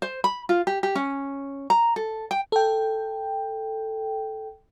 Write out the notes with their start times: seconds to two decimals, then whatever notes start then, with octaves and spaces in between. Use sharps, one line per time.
0.02 C5
0.24 B5
0.49 F4
0.67 G4
0.83 G4
0.95 C#4
1.70 A#5
1.96 A4
2.31 G5
2.52 A4 G5